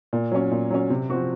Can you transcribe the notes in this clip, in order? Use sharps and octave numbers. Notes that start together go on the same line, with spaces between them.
A#2
F#3 C#4
A#2
F#3 C#4
C3
F3 C4 F#4